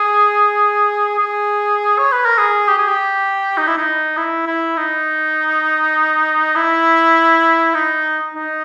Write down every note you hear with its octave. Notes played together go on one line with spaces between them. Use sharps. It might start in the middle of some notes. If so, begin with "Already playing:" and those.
Already playing: G#4
G#4
C#5
B4
A#4
G#4
G4
G#4
G4
D#4
E4
D#4
E4
E4
D#4
E4
D#4
D#4